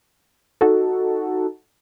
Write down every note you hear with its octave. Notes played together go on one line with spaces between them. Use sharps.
D#4 F#4 A4